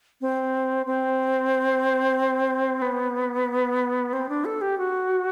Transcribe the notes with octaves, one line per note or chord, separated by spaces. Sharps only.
C4
C4
B3
C4
D4
A4
G4
F#4